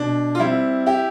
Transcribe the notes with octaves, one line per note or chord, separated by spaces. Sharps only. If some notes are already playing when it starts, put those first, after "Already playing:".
Already playing: B2 D4
F4
G3 C4 E4
E4 G4